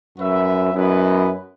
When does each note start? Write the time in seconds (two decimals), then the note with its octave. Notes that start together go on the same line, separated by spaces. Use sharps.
0.17 F#2 F#4 B4 E5
0.74 F#2 B3 E4 B4 D#5